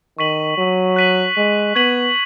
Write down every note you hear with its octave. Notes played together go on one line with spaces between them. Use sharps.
D#3 C#6 B6 D#7 F#7
F#3
F#6 B6 D#7 F#7
G#3
B3 C#6 G#6 B6 D#7 F#7